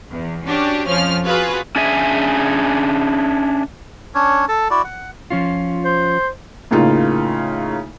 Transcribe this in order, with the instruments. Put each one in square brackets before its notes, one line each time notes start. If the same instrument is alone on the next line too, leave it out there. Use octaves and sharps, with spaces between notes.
[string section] E2
C#4 D4 F#4 G4
F2 F3 C#4 F6
F4 F#4 G#4 B4
[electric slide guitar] C#4 D4 G#4 E5 G#5
[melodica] C#4 D4 C#5
A4 A5
E4 F#4 D5
F#5
[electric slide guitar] F3 C#4 F4
[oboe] C5
[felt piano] A2 C#3 A#3 D#4 F4